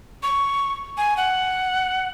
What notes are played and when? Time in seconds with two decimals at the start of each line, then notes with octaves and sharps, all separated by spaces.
0.23 C#6
0.97 G#5
1.17 F#5